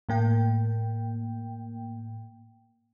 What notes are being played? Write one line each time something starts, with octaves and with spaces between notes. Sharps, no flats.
A2 A#3 G5